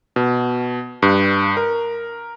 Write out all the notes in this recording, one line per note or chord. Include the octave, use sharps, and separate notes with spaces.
B2
G2
A#4